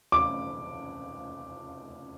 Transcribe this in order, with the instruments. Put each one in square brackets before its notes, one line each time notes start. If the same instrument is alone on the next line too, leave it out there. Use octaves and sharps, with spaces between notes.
[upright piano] D6